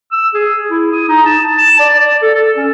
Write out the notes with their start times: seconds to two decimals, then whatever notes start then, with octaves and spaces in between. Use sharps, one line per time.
0.12 E6
0.34 G#4
0.70 E4
0.93 D#6
1.08 D#4
1.26 A5
1.58 A5
1.80 D5
2.00 D5
2.22 A4
2.34 A4
2.57 C#4